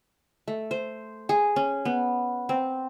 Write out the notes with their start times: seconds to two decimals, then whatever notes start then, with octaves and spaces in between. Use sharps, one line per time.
0.48 A3
0.71 C5
1.29 G#4
1.56 C#4
1.85 B3
2.49 C4